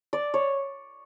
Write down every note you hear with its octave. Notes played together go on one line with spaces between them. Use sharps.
D5
C#5